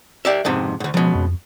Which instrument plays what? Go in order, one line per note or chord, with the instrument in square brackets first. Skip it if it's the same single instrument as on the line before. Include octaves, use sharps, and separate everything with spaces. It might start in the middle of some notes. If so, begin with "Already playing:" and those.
[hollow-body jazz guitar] G4 D5 E5
F2 G#2 C3
D2 G#2
[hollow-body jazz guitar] C#2 B2 [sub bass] F3
[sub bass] F2